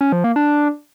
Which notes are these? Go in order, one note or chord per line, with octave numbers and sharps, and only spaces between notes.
C#4
F3
A#3
D4